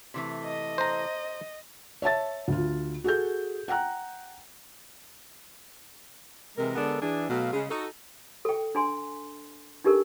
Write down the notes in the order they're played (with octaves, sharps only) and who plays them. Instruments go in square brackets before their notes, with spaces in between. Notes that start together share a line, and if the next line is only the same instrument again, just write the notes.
[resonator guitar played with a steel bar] C3 E3 A3
[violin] D#5
[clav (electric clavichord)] C5 A#5
[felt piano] C#5 E5 A5 A6
D2 F4
F#4 G#4 A4 G6
F#5 G5 A#5 F#6
[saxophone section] C3 E3 G#3 A#4
D3 G#3 B3 D4 A4 A#4
E3 D4 G#4
B2 F#3 A3 F5
C#3 G#3
D#4 F#4 A4
[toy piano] A4 G5
D4 G#5 C6
D4 D#4 G4 A4 A#4